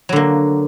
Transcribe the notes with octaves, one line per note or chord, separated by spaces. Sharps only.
D3 F#3 A#3